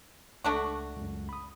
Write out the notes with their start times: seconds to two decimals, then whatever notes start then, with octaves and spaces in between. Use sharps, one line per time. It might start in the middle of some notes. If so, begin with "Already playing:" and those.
0.44 C#2 A3 D4 F#4
0.97 C#2 F#2
1.29 B5 D#6